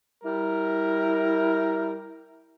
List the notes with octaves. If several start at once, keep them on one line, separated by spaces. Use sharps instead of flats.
G3 E4 A#4